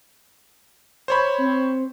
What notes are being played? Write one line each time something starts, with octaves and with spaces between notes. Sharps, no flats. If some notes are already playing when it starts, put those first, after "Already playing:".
C5 C#5 B5
C4